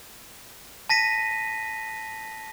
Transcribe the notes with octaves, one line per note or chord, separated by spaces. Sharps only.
A5 A#6 B6 D#7